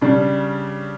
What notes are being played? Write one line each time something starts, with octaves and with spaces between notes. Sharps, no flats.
C#3 G3 D4